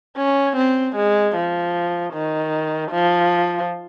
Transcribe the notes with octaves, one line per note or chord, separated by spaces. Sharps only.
C#4
C4
G#3
F3
D#3
F3